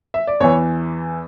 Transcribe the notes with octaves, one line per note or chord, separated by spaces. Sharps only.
E5
D5
E2 E3 C#5